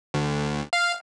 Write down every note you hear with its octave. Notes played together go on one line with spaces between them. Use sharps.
D2
F5